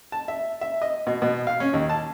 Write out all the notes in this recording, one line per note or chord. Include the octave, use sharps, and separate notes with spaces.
A5
E5
E5
D#5
B2
B2
F5
C#4
D#2
A5